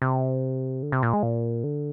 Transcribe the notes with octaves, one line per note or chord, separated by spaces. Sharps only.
C3
D3
C3
A#2
G#3
A#2
D3